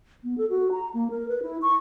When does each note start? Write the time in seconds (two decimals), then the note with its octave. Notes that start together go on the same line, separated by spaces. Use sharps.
0.24 B3
0.38 A4
0.50 F#4
0.72 A#5
0.94 A#3
1.11 A#4
1.29 B4
1.43 E4
1.62 C#6